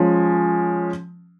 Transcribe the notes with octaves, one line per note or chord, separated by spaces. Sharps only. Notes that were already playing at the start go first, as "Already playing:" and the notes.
Already playing: F3 G#3 C#4